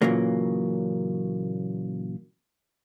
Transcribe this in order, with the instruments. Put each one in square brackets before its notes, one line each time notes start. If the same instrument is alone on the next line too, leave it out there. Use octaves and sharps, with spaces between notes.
[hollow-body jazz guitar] A#2 C#3 E3 F#3 A#3